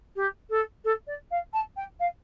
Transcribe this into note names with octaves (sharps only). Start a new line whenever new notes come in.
G4
A4
A4
D5
F5
A5
G5
F5